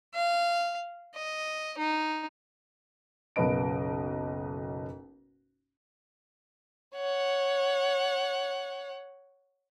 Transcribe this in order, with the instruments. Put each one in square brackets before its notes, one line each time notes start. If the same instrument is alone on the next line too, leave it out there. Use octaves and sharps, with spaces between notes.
[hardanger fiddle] F5
D#5
D#4
[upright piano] F#1 B1 A#4 B4 D#5 D7
[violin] C#5 F#5